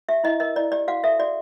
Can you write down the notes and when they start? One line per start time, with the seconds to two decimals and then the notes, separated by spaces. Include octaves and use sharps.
0.09 G4 E5
0.24 E4 D#5
0.40 A#4 D#5
0.56 E4 D5
0.72 G4 D5
0.88 F#4 F5
1.04 A4 E5
1.19 F#4 D5